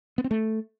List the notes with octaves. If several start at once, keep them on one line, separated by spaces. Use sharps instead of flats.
B3
C4
A3